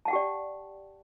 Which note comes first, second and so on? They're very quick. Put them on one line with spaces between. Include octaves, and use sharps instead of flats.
A5 F#5 G5 G4 D5